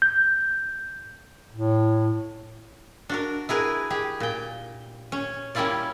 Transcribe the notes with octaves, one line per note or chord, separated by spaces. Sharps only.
G6
A2
D4 F#4 A#4
E4 G#4 A#4 B4
G4 G#4
A#2 G5
C#4
G3 A#3 C#4 E4 F4 D5